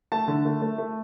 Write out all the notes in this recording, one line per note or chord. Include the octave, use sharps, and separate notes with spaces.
A3 A5
D3
A3
A3
A3